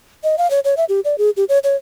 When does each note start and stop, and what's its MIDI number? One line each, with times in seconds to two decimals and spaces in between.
0.24 0.36 75
0.38 0.49 77
0.50 0.60 73
0.65 0.75 73
0.77 0.85 76
0.89 1.00 67
1.05 1.16 74
1.18 1.30 68
1.37 1.44 67
1.49 1.59 73
1.64 1.76 73